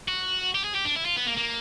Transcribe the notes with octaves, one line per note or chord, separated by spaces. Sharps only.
F#4
G4
G#4
G4
D4
E4
F4
B3
A#3
A#3